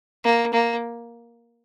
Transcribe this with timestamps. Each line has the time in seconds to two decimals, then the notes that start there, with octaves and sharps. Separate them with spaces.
0.25 A#3
0.54 A#3